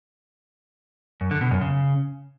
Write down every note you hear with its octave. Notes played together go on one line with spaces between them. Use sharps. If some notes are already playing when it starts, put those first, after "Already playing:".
F#2
D3
B2
F#2
C#3